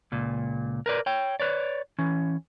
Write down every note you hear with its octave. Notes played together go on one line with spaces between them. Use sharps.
C#2 A#2
A#4 B4 D5
C#5 G5
B4 C#5 D5
E3 C#4